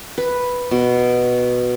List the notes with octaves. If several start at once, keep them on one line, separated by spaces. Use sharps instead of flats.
B4
B2